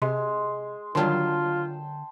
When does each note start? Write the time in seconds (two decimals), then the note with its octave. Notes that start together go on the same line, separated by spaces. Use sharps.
0.02 C3 G#3 C6
0.95 D3 D#3 F#3 G3 F4 G5 A5 C6